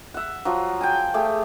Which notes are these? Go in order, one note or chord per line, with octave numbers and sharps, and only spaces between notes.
E5 F#5
F3 F#3
G5 G#5
A3 G4 G#4